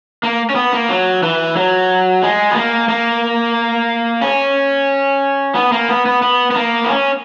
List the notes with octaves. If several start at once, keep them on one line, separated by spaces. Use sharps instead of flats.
A#3
C#4
B3
A#3
F#3
E3
F#3
G#3
B3
A#3
A#3
C#4
B3
A#3
B3
B3
B3
B3
A#3
B3
C#4